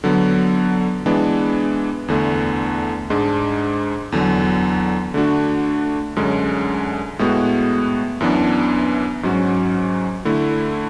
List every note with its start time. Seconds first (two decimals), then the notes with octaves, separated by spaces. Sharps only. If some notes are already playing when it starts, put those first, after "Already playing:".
0.04 D3 F#3 B3
1.06 E3 G#3 B3 D4
2.08 E2 D3 A3
3.10 G#2 G#3 D4
4.12 E2 D3 F#3
5.14 D3 A3 D4 F#4
6.16 F#2 D3 G#3 C#4
7.19 A2 G#3 B3 F#4
8.21 F#2 E3 B3 D4
9.23 G#2 F#3 C#4 F#4
10.25 D3 A3 E4